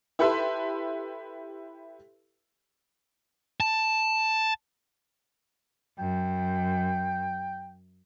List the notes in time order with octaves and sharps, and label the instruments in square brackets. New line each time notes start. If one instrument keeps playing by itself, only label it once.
[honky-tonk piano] E4 G4 A4 B4 E5 C6
[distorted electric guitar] A5
[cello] F#2 [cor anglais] G5